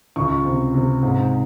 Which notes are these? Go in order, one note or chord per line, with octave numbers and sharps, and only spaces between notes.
C#2 C#6
C3
C3
G#2